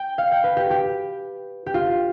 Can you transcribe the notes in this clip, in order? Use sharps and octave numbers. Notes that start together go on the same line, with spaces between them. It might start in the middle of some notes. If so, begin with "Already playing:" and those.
Already playing: G5
F5
G5
B4
G4
G4
G4
F4